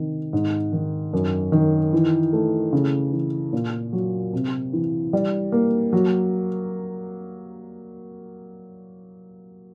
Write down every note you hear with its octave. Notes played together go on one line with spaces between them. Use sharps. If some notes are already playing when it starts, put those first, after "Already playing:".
Already playing: C3 D#3
G#2
D#3
F#2
D#3
E3
A3
C#3
E3
A#2
F#3
C3
E3
G3
A#3
F#3